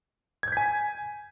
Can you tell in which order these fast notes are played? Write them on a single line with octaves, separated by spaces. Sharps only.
G#6 G6 B6 G#5